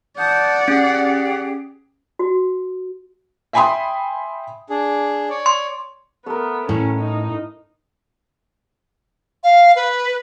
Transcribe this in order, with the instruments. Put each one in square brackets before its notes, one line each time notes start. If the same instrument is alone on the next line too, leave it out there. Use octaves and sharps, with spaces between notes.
[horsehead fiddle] D5 F#5 [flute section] A5 D#6 G6
[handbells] C#4 [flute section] G4 G#4
[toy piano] F#4
[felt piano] E5 G5 G#5 B5 C6 D#6
[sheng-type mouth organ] D4 G#4
C#5 D5
[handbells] C6
[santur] A3 A#4 [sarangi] B3
[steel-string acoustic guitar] A2 [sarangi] C#4
[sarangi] D#4
[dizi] F5
B4